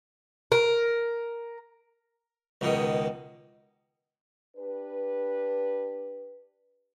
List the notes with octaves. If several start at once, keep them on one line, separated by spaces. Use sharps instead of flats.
A#4
C#2 B2 D#3
D4 G4 B4